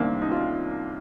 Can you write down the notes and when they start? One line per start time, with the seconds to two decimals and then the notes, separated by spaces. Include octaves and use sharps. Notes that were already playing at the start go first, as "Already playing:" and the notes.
Already playing: C2 C3 D#3 A#3 C4 D4
0.22 D#4
0.31 F4